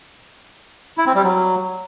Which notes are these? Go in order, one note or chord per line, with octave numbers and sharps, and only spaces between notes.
E4
C4
G3
F#3